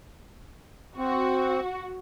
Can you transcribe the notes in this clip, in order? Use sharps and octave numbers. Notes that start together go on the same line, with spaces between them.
C4 F#4